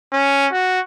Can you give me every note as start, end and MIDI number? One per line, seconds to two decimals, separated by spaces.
0.13 0.47 61
0.52 0.80 66